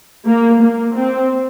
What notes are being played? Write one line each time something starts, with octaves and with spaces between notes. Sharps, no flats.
A#3
A#3
C4